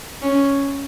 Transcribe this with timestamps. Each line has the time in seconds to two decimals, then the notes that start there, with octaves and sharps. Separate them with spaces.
0.22 C#4